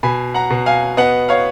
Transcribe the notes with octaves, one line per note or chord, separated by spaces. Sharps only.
B2 G#5 B5
F#5 A#5
B2
F5 G#5
B3 D#5 F#5
C#5 F5